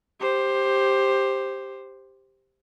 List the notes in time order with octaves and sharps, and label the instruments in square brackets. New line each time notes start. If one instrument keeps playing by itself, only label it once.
[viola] G4 C5